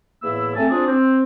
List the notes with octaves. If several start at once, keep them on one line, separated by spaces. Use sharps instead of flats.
E2 A2 A#3 E4 E6
A3 C4 G#5 A5
C4 D4 F4 G#4 D5
C4